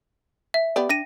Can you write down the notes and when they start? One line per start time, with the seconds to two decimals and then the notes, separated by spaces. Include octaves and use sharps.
0.54 E5
0.76 B3 G4 D5
0.89 D4 G5 A#6 D#7